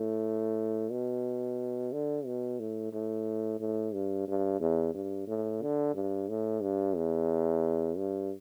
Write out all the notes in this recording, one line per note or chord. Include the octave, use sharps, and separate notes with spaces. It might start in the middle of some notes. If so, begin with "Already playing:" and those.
Already playing: A2
B2
D3
B2
A2
A2
A2
G2
G2
E2
G2
A2
D3
G2
A2
G2
E2
G2